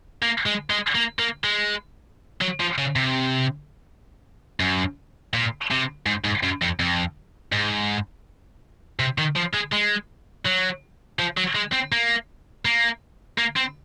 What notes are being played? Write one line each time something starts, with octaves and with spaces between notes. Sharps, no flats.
A#3
G#3
G#3
A#3
A#3
G#3
F#3
F3
C#3
C3
F#2
A#2
C3
G#2
G#2
F#2
F2
F2
G#2
C3
D#3
F3
G#3
G#3
F#3
F3
F#3
G#3
C4
A#3
A#3
A#3
C4